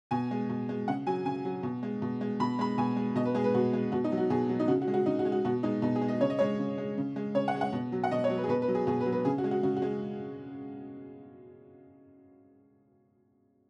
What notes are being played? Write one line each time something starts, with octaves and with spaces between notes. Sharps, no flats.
B2 G#5
G#3
B2
G#3
C#3 F#5
F#3 G#5
C#3 G#5
F#3
B2
G#3
B2
G#3
B2 B5
G#3 B5
B2 G#5
G#3
B2 D#5
B4
G#3 G#4
B4
B2 F#4
G#3
B2 F#4
D#4
F#3
F#4
B2 G#4
F#3
D#4
C#3 F#4
F#4
G#3
F#4
C#3 D#4
F#4
G#3
F#4
B2 F#4
G#3 D#4
B2 D#4
G#4
G#3
D#5
C#3 C#5
D#5
G#3 C#5
C#3
G#3
C#3
G#3
C#3 C#5
F#5
G#3
F#5
B2
F#3
F#5
B2 D#5
C#5
F#3
B4
G#4
B2 B4
B4
F#3
G#4
B2 G#4
B4
F#3
B4
C#3 G#4
F#4
G#3
F#4
C#3 F#4
F#4
G#3